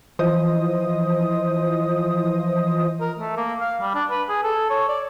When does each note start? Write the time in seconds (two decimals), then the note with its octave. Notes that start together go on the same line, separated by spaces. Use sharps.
0.19 E3 F3 C5 D#5 D#6
3.00 A#4
3.19 A3
3.37 A#3
3.60 F5
3.81 G3
3.95 D4
4.11 B4
4.29 G#4
4.43 A4
4.70 C#5
4.89 D5